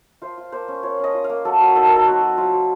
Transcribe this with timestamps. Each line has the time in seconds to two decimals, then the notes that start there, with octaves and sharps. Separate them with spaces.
0.22 F4 C5
0.38 F4
0.52 A#3 C5
0.68 C#4
0.83 F4 C#5
0.99 C#4 D#5
1.14 F4
1.24 F5
1.30 A#3
1.45 F#3 A4
1.60 F#3
1.76 D#4 A4
1.86 A#4
1.91 F#3 A4
2.07 C4 F#4
2.22 F#3
2.37 F#3 F4
2.52 F#3